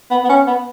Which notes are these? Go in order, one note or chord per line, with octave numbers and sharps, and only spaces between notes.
B3
B3
C#4
B3